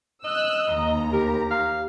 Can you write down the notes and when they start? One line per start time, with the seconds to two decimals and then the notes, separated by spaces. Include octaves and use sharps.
0.24 D#5 E6 F#6
0.74 D#2 A#5
1.13 G4 A#4
1.51 F5